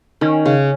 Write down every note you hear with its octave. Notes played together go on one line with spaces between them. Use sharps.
D#3 C#4
C#3